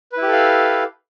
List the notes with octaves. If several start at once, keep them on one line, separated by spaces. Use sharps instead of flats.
E4 G4 A4 B4 F5